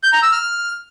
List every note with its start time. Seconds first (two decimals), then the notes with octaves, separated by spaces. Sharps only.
0.03 G6
0.13 A#5
0.23 E6
0.32 F6